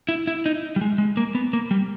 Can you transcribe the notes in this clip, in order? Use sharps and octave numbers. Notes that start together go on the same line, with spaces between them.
E4
E4
D#4
G3
G#3
G#3
A#3
B3
A#3
G3